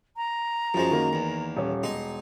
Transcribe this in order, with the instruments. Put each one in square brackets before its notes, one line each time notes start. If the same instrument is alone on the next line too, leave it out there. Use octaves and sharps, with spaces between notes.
[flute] A#5
[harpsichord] F#2 G#3 [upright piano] F3 C5
[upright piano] D#3 A#3
[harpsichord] E2
[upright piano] D#1 C#4
[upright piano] E1 [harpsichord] D#4 C6